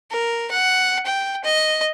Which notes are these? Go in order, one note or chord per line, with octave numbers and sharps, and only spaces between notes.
A#4
F#5
G5
D#5